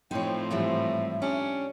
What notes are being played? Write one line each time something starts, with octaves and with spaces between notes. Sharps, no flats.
A2 F3 C4 D#4 E4 C#5 G5
G#2 E3 G3 E5
C#4 D4 G4